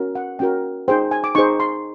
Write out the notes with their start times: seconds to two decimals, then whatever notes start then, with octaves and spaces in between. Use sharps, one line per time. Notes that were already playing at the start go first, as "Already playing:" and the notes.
Already playing: C#4 F#4 A#4
0.15 F#5
0.39 C#4 F#4 A#4 G5
0.88 D#4 G#4 C5 G5
1.11 G#5
1.24 D6
1.35 D#4 G#4 C5 C#6
1.60 C6